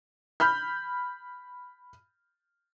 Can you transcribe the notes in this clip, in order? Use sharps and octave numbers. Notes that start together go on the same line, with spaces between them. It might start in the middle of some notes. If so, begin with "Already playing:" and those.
B5 F6 G6